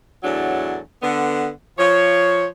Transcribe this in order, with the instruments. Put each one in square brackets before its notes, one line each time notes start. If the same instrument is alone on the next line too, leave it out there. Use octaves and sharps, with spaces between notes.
[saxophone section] E2 A2 F#3 D4 A4
D3 B3
F3 C#5